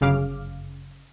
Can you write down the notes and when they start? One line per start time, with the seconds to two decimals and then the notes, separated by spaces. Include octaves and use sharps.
0.01 G1 F#2 C#3 F5 D6 F6